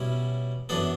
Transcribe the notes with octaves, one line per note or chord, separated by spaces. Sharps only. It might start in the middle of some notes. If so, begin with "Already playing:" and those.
Already playing: B2 G3 C#4 E4
F#2 E3 B3 D4 A4